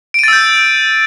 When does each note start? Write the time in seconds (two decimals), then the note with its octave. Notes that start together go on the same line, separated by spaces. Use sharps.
0.14 D7
0.19 D#7
0.23 A6
0.28 E6
0.33 G6